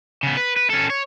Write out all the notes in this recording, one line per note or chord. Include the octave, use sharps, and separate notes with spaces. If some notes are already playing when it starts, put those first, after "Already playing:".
C#3 B3
B4
B4
C#4 A4
C#5